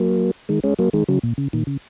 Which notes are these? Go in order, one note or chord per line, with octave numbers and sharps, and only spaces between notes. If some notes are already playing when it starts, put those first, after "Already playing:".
Already playing: F#3 A#3
D#3 G#3
G#3 C#4
F#3 A#3
D#3 G#3
C#3 F#3
A#2
C#3
A#2 D#3
C#3